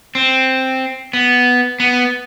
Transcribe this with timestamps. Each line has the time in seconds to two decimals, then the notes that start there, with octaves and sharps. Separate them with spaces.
0.15 C4
1.13 B3
1.80 B3